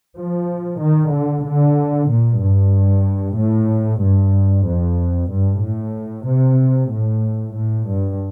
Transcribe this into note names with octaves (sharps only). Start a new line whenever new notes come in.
F3
D#3
D3
D3
A#2
G2
A2
G2
F2
G2
A2
C3
A2
A2
G2